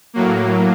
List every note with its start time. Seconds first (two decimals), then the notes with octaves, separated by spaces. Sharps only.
0.14 A2 F#3 A#3